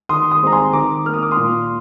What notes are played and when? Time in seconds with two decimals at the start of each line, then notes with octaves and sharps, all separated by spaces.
0.09 D#3 C6 D#6
0.31 C6 D#6
0.42 G#3 C4 A#5
0.52 G#5 C6
0.73 D#3 A#5 D6
1.06 A#3 F6
1.14 D#6
1.22 D6
1.31 C6 D#6
1.37 A#2